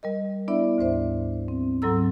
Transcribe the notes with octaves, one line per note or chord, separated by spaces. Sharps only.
G3 A#4 D#5
B3 D4 E4 D5 E5
D2 G#2 C5 E5
C4
G#2 F#3 C4 A4 A#5 E6